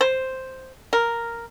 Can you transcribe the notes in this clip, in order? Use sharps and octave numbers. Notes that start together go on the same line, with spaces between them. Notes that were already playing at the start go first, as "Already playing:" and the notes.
C5
A#4